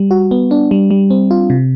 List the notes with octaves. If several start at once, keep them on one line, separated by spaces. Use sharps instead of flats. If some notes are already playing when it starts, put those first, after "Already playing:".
Already playing: G3
F#4
B3
D4
G3
G3
C4
F4
C3